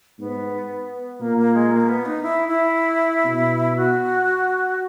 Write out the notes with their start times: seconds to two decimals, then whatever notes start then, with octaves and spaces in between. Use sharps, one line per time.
0.19 G#2 B3
1.20 A#2 A#3
1.38 A#3
1.54 G#3
1.72 A#3
1.88 B3
2.05 D#4
2.23 E4
2.48 E4
3.25 B2
3.76 F#4